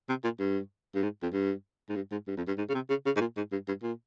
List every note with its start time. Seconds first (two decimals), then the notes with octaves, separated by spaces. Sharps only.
0.09 C3
0.24 A#2
0.39 G2
0.95 G2
1.03 G#2
1.23 F2
1.33 G2
1.89 G#2
1.95 G2
2.11 G#2
2.27 G2
2.37 F2
2.48 G2
2.58 G#2
2.69 C#3
2.74 C3
2.89 C#3
3.06 C#3
3.16 G#2
3.20 A#2
3.37 G#2
3.52 G2
3.68 G2
3.83 A#2